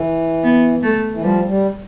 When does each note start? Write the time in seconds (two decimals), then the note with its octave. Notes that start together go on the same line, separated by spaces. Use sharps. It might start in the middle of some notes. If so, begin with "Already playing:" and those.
Already playing: E3
0.43 B3
0.82 A3
1.13 E3
1.22 F3 G3
1.49 G3